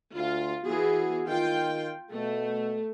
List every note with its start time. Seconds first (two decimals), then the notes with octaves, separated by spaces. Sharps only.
0.15 D2 F4
0.65 E3 B3 F#4 G#4
1.28 D#3 F4 G5
2.13 B2 A3